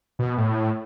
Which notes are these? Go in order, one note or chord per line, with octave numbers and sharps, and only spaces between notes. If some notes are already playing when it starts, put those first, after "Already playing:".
B2
A2